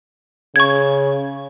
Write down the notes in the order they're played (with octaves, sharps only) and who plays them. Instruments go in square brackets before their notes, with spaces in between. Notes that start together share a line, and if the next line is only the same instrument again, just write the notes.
[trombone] C#3 [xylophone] C#6 G#6